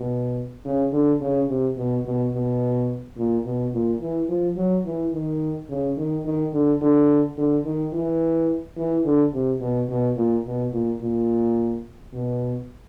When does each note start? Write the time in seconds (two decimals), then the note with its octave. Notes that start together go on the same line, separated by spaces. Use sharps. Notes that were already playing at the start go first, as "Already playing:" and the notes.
Already playing: B2
0.65 C#3
0.93 D3
1.21 C#3
1.49 C3
1.77 B2
2.05 B2
2.33 B2
3.17 A#2
3.45 B2
3.73 A#2
4.01 E3
4.29 F3
4.57 F#3
4.85 E3
5.13 D#3
5.70 C#3
5.97 D#3
6.25 D#3
6.53 D3
6.82 D3
7.38 D3
7.65 D#3
7.93 E3
8.77 E3
9.05 D3
9.33 C3
9.61 B2
9.89 B2
10.17 A#2
10.45 B2
10.73 A#2
11.01 A#2
12.13 B2